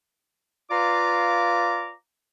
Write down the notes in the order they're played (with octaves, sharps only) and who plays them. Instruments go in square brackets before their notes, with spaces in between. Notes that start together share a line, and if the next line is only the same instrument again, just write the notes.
[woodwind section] F4 B4 D5 F5 A#5 D6